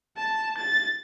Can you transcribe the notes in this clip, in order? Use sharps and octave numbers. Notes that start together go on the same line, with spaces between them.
A5
A6